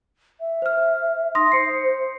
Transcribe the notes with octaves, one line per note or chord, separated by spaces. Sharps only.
E5
C5 F6
D#4 C6 D#6 A#6
C5 C7 C#7